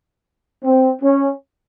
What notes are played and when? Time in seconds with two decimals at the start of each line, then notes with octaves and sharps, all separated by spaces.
0.64 C4
1.02 C#4